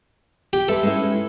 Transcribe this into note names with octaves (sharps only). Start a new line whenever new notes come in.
G4
G#3 A4 B4 E5
G#3 C#4 E4